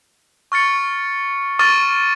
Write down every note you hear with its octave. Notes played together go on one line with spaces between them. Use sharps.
C#6 F6 A6 C#7
C#6 D6 F6 A6 D#7